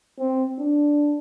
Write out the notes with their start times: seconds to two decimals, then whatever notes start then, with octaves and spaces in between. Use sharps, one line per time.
0.19 C4
0.59 D4